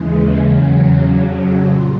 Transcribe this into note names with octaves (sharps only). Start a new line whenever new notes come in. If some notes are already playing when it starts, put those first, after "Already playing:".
Already playing: D#2 C#3 E3 G#3
E2 C#3 F#3 C#4
F2 C#3 F#3 D4
A#2 G3 F4